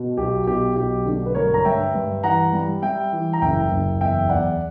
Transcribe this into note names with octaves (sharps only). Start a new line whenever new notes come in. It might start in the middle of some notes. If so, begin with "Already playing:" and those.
Already playing: B2
B1 G4
B2 G4
B1 G4
D3
B4
G2 A#4 C#5
A#5
G2 E5 G5
G2
E3 F#5 A#5
G3
G3 E5 G5
E3
A#5
F#1 E5 G5
F#1
E2 E5 G5
E2 D5 F#5